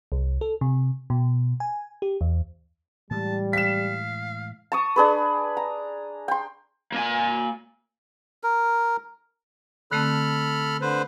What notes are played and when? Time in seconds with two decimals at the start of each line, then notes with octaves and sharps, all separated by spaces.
0.12 C2
0.41 A4
0.61 C3
1.10 B2
1.60 G#5
2.02 G4
2.21 E2
3.11 A2 E3 G3 G#3 A5
3.53 F5 B6 E7
4.72 A5 C#6 D#6
4.96 D4 G#4 B4
5.57 A#5
6.28 G5 C6
6.93 A#3 G#5
8.43 A#4
9.92 D3 A3 C4 A4 B5 F6
10.81 D3 B4 C5